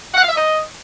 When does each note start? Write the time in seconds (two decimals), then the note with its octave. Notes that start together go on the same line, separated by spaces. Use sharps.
0.14 F#5
0.22 F5
0.28 E5
0.36 D#5